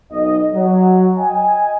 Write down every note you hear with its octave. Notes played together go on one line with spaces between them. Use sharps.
B1 D#5
F#3
D#5 G5 G#5